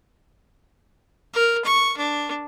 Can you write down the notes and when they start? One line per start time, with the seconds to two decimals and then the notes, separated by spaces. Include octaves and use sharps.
1.34 A#4
1.65 C#6
1.98 D4